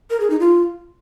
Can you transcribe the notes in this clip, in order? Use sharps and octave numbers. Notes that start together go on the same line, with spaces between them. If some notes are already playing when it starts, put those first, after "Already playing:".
A#4
G#4
D#4
F4